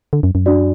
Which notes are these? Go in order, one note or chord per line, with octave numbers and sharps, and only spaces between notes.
D3
F#2
F#2
D4 F#4 D5